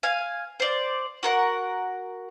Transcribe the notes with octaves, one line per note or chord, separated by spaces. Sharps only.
F5 G#5
C5 D5
F#4 A#4 F#5